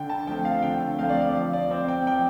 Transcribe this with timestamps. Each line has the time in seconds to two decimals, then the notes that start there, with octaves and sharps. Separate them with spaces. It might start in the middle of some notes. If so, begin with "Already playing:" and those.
Already playing: D3 G5
0.09 A5
0.27 F3 A3 C4 G5
0.45 F5
0.62 D3 G5
0.98 F3 A3 C4 F5
1.09 D5
1.21 F5
1.34 F3
1.53 D5
1.71 C4
1.88 G5
2.07 F3 G5